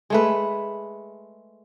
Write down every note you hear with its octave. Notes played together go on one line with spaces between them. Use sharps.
G#3 A3 B4